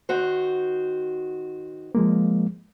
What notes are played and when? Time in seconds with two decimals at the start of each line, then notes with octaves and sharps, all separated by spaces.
0.09 D#3 F#4 C5
1.95 F3 G#3 A#3